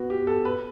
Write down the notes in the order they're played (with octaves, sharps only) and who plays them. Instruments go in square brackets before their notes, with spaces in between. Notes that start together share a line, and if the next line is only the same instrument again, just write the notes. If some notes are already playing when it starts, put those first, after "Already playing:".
Already playing: [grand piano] B3 F#4
G4
A4
B4